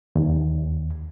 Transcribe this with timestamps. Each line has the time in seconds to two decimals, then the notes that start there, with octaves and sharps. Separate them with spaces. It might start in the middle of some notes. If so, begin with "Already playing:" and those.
0.16 D#2